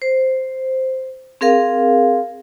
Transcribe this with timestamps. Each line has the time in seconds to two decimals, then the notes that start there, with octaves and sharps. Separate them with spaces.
0.02 C5
1.41 C4 G#4 A#4 F5